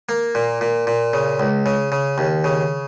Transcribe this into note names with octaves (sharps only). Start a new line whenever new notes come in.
A#3
A#2
A#2
A#2
C#3
C#2
C#3
C#3
D#2
C#3